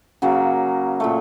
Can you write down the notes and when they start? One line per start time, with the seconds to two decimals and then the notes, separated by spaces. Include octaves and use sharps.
0.22 C#3 F#3 A#3
1.00 A#2 F#3 A3